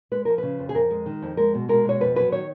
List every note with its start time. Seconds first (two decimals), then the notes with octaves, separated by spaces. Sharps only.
0.11 G#3 B4
0.25 F3 A#4
0.38 C#3 B4
0.59 F2
0.69 G#4
0.75 F2 A#4
0.90 G#3
1.06 D#3
1.22 F2
1.37 G#3 A#4
1.54 B2
1.68 G#3 A#4
1.85 B2 C#5
2.00 F2 B4
2.16 F#3 B4
2.32 D#3 C#5